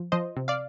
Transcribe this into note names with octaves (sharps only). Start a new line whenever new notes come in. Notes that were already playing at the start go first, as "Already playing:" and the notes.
Already playing: F3
F3 C5 D#5
C3
D5 F5